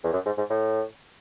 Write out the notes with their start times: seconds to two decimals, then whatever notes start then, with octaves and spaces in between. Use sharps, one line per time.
0.04 E2
0.13 F#2
0.26 G#2
0.38 G#2
0.50 A2